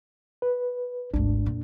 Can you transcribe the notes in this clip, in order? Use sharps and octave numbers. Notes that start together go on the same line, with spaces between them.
B4
G#1 D2 D4
F2 A#2